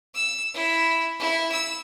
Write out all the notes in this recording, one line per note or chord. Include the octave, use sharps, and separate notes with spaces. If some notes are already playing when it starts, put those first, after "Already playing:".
E6
E4
E4
E6